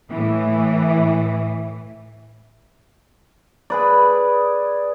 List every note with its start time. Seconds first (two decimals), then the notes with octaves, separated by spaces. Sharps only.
0.11 A2 E3
3.70 G#4 B4 D5